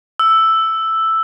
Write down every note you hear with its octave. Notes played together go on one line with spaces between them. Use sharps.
E6